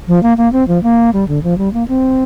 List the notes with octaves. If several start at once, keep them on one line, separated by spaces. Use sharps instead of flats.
F3
A#3
A#3
C4
F3
A#3
G3
D3
F3
G3
A#3
C4